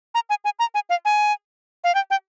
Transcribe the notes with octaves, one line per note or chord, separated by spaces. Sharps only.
A#5
G#5
G#5
A#5
G#5
F5
G#5
F5
G5
G5